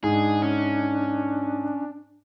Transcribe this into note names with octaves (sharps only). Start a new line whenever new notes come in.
G#2 D4 G#4
C#4